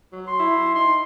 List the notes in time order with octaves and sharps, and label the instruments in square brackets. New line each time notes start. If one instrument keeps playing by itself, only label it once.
[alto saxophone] F#3
[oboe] C6
[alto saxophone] E4
[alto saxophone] D#4 [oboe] C6